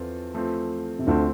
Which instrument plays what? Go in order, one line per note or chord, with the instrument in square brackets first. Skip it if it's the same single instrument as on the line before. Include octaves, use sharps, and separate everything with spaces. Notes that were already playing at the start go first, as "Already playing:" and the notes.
Already playing: [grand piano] E2 [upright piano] F3 C4 F4 A4
[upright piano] F3 A3 C4
[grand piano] C3
[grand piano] D2 D3 [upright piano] F3 A3 C4